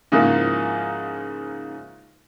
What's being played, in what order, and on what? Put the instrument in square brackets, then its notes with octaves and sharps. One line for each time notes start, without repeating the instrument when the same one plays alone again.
[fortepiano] G#2 C#3 F3 A#3 E4